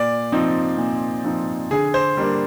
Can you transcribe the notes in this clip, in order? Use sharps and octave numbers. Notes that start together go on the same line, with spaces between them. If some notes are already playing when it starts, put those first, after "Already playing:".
Already playing: A#2 D5
F3 C4 D#4
A#2
F3 C4 D#4
D3 G#4
C5
G3 A#3 D4